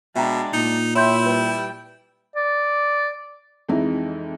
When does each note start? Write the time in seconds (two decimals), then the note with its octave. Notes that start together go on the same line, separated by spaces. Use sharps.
0.16 B2 G#3 D4 E5 G5 A#5
0.53 A#2 D#4
0.95 E4 C#5 E5 G5 C6 G6
1.26 G3 B4 G5
2.36 D5
3.69 F2 E3 G#3 D#4 E4